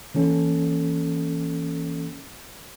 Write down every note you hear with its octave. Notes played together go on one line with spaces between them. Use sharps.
E3 A#3 C#4 A4